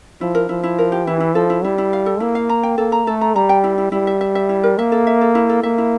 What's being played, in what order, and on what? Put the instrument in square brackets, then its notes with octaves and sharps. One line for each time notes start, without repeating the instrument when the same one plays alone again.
[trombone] F3 [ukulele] E4
[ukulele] A#4
[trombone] F3 [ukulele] E4
[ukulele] E4
A#4
G4
[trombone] E3 [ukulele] E4
[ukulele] E4
[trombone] F3 [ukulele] A4
[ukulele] E4
[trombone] G3 [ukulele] E4
[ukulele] E4
F5
A4
[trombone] A#3 [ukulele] E4
[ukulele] F5
A#5
G5
[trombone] A#3 [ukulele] A4
[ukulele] A#5
[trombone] A3 [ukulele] A4
[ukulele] A#5
[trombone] G3 [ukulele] A#5
[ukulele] G5
E4
E4
[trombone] G3 [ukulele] E4
[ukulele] E5
E5
E5
E4
A#4
[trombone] A#3 [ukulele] E5
[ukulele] A4
E5
A4
E4
A4
[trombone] A#3 [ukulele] E5
[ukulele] E4